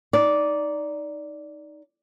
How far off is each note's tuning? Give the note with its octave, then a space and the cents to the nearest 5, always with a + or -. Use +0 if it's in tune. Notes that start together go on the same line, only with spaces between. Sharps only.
D#4 +0 D5 -10